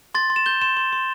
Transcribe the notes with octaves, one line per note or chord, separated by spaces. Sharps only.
C6 A6
C6
E7
G6 G7
C6 E7
C6
C6